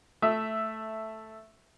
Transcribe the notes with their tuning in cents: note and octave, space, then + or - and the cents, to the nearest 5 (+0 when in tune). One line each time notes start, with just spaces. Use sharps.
A3 +0 E5 +0